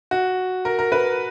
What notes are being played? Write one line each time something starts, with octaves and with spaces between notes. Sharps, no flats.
F#4
A#4
A#4
B4